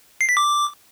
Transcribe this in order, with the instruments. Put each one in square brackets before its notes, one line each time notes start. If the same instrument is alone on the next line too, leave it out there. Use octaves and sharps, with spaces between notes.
[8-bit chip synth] C7
B6
D6